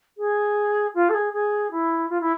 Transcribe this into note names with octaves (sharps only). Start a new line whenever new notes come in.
G#4
F4
A4
G#4
G#4
E4
F4
E4